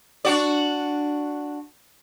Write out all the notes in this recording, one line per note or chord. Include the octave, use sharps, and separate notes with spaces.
D4 F#4 D5